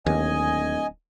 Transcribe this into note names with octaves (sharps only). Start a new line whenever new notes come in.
D1 D#2 D#5 G#5